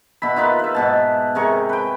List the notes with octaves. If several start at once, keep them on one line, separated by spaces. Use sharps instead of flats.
B2 E5 B5
D#4 F4 A#4 B4
B4 E5
G#2 B2 A5
C3 G#4 A#4 C#6
B4 G5